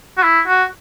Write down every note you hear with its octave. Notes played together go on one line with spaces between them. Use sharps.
F#4
E4
F#4